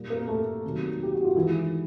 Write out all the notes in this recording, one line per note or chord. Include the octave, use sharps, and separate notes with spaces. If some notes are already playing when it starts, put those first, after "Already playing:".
Already playing: A#2 G3 A#3
A#3 A#4
A3 A4
C3 D#3 F#3 A#3
G4
F#4
F4
D#3 E3 G#3 E4